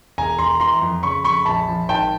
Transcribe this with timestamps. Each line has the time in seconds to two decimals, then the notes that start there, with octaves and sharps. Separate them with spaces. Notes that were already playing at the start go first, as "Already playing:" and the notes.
0.18 E1 G#5 A#5
0.38 E1 A#5 C6
0.60 E3 A#5 C6
0.82 F2
1.03 C#3 B5 C#6
1.24 F2 B5 C#6
1.45 A#1 A5 B5
1.68 F3
1.88 G#1 G5 A5